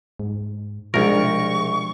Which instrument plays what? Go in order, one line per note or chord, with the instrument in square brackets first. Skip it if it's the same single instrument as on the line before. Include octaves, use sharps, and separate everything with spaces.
[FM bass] G#2
[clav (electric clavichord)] C2 A#4 [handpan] B2 G#3 D4 [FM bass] F3 [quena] C#6